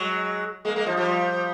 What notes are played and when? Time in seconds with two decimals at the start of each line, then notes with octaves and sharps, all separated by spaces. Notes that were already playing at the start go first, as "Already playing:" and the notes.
Already playing: F#3 G#3
0.65 G#3 A#3
0.76 G#3 A#3
0.86 F3 G3
0.97 F3 G3